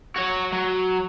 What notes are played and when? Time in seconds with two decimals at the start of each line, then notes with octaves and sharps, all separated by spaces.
0.16 F#4 C#5
0.53 F#3